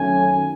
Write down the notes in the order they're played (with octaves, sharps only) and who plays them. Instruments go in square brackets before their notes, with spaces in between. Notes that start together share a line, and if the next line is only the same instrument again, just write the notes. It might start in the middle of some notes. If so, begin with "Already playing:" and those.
Already playing: [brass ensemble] F#2 D#3 A3 C#4 G#5